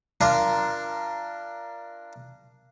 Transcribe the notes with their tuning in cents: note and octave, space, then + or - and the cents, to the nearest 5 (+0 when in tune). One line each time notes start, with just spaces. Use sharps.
D4 +5 F4 -20 A#4 +0